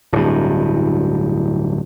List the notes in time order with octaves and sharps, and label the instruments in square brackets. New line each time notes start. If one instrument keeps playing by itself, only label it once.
[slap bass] D1 G2